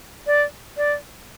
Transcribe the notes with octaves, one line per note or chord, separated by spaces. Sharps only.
D5
D5